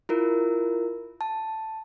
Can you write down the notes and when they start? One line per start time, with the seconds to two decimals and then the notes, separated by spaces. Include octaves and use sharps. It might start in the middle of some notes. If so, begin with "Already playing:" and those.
0.09 E4 F4 A#4
1.21 A5